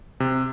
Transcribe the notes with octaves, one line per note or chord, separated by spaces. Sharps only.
C3